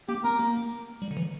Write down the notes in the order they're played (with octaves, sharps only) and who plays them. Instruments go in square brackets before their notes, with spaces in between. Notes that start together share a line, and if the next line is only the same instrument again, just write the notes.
[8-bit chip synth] A#3 [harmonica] G4
[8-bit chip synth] B3 [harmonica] A#4
[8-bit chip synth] A#3
G3
D3
E3